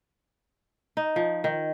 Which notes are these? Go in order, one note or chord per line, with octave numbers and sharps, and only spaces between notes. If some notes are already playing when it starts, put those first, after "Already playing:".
D#4
F3
D#3